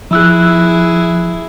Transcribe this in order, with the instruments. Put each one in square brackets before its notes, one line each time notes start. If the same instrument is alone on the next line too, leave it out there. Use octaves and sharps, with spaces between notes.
[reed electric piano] F3 E6 F#6 [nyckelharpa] E4 G#4